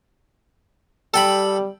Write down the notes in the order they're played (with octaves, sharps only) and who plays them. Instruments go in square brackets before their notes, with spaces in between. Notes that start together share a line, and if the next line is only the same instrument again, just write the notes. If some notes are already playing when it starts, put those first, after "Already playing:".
[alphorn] G3 [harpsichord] A4 G5 B5